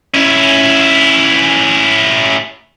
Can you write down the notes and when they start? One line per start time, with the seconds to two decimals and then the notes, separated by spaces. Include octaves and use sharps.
0.14 C#4 E4